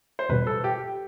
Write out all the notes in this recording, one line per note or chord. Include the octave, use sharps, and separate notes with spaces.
C5
E2 B2 G3 B4
A4
G4